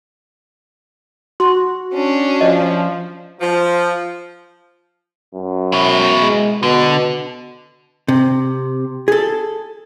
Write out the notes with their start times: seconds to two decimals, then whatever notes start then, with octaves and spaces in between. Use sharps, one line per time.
1.40 F#4 C6
1.93 C#4 D4
2.41 F3 D5 D#5
3.40 F3
5.35 F#2
5.72 B2 E4
6.21 G#3
6.63 B2 D3
8.08 C3
9.08 G#4 A4